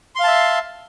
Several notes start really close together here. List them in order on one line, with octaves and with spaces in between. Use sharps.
C6 F5 A5 E5